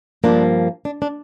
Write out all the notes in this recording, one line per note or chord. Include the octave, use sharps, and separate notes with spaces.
G2 F3 A#3 D4
D4
D4